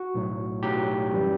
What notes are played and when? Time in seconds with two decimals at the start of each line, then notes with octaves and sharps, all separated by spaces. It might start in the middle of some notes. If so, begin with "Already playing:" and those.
Already playing: F#4
0.14 B1 A2 F#3
0.63 B1 A2 F#3 G4
1.12 F#2 E3 G3